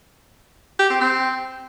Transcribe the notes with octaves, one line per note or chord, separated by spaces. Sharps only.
G4
C4
C4